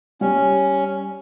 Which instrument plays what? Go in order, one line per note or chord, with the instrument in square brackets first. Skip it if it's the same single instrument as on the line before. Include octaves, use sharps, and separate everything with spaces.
[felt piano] G3 [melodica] C#4